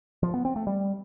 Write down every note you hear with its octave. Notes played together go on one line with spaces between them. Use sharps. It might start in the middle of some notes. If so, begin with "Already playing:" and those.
F3
B3
C4
A3
G3